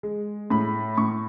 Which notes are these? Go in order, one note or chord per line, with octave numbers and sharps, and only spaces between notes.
G#3
A2 B5
A2 C#6